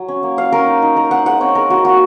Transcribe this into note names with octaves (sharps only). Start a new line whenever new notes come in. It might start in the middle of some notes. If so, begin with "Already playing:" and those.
Already playing: F#3
C#4
A#3
C#4 F5
C#4 A#4
D#4
D#4
D#4 A#4
D#4 F#5
G#3 F#5
C4 C#5
G#3 A#4
C4 F#4
A#3 F#4